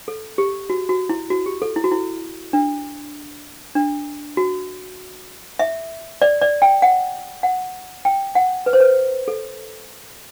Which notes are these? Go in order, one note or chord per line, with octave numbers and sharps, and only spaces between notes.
A4
G4
F#4
F#4
E4
F#4
G4
A4
E4
F#4
E4
D4
D4
F#4
E5
D5
D5
G5
F#5
F#5
G5
F#5
B4
C5
B4
A4